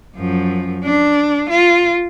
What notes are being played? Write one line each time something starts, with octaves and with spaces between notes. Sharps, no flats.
F#2 F3
D4
F4